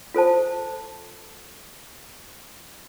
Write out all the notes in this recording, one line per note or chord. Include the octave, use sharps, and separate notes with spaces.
F4 A4 C5 A5